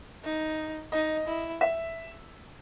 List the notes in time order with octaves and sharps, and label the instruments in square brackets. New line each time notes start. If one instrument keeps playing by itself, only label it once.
[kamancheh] D#4
[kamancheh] D#4 [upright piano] D#5
[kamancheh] E4
[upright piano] E5